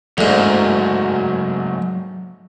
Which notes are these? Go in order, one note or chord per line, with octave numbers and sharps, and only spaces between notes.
D2 G#2 F#3 A#3